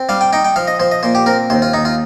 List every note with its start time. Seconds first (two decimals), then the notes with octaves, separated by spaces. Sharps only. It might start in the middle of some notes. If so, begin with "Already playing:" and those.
Already playing: C4
0.09 G3 F5
0.21 G5
0.33 D#4 G5
0.45 G5
0.56 F3 F5
0.68 D#5
0.80 F3 C5
0.92 D#5
1.03 A#2 C5
1.15 G4
1.26 C4 A#4
1.50 D#2 C5
1.62 F4
1.73 D#2 D#4
1.85 F4